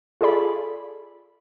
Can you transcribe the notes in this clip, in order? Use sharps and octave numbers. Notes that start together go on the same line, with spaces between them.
F4 G#4 A4 D5 B5